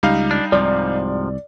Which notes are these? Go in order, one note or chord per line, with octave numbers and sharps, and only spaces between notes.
C#2 G3 D#4 F5
D4
C2 G#2 C3 F3 D5